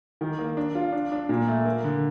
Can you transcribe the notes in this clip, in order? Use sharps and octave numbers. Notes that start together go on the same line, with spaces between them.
D#3
A#3
D4
F4
D4
D4
A#2
A3
A#3
D3